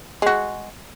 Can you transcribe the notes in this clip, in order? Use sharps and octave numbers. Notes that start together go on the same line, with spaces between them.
G#3 F#4